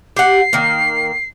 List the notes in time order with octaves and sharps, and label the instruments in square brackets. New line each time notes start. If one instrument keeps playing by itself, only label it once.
[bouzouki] G4 F#5 [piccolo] C7
[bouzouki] D#3 A#3